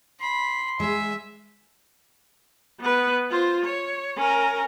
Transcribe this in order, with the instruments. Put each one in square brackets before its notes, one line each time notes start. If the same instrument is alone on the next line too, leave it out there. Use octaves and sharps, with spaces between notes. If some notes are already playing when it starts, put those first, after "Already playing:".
[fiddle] B5 [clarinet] C6
[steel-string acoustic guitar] G#3 G#4 [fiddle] E5
[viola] B3 B4
F4 C5
C#5
C#4 A#4